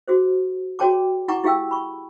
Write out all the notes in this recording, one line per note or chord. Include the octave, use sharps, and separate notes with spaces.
F#4 G#4 C5
F#4 G#4 C#5 G5 A5 D6
E4 F#5 G#5 A#5 C#6 D6
E4 G4 G#4 F5 G5 E6
B5 C#6